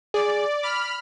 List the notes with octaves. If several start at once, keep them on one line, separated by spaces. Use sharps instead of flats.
G#4 D5
B5 D6 F6